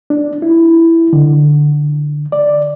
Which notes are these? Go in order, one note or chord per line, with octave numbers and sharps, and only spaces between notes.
D4
E4
D3
D5